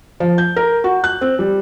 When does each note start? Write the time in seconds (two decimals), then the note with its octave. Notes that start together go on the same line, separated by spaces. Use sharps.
0.20 F3
0.38 G6
0.56 A#4
0.84 F#4
1.04 F#6
1.21 C4
1.39 G3